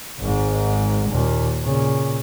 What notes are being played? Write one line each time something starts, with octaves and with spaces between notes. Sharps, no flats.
G#1 G#2
D#2 A#2
A#2 C#3